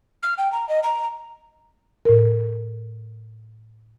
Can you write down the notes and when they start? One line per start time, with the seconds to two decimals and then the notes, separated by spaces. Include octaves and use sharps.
0.23 F6
0.38 G5
0.52 A#5
0.69 D#5
0.83 A#5
2.05 A2 A#4